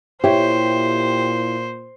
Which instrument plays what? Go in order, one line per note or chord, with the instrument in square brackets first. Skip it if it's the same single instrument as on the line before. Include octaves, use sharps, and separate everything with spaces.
[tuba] A#2 [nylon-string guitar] E4 C#5 [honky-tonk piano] G4 [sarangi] C5